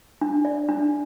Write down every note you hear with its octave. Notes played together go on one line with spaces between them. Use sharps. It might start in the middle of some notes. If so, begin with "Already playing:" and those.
D4
D5
D4